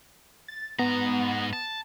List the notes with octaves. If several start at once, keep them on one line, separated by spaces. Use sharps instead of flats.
A6
G#2 B3 A#5
A5